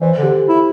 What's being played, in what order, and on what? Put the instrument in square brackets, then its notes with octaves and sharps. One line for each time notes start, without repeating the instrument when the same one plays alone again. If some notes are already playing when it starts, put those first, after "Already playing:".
[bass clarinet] E3 [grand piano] C5
[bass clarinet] D3 [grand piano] G4
[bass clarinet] E4